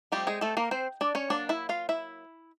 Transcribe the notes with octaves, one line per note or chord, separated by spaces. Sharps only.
F3 G3 A3 C4 D#4 G4
G#3 G#4
A3 A4
A#3 A#4
C4 C5
D4 D5
C#4 C#5
F#3 A#3 D4 D5
E4 E5
F4 F5
E4 E5